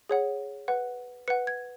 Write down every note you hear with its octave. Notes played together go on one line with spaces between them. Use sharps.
G#4 C#5 F#5
B4 F#5
B4 F#5 C#7
G#6